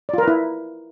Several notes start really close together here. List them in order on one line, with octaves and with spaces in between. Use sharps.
D5 F4 A#4 B4 E4